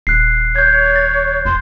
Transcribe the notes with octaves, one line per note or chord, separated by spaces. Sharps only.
D#1 F#6 C7
C#5 G6 G#6
A6
F1 C6